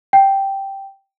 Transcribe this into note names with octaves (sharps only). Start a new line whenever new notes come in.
G5